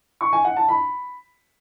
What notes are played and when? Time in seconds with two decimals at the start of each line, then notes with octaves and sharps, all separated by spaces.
0.21 C#6
0.33 G#5
0.45 F#5
0.56 A5
0.68 B5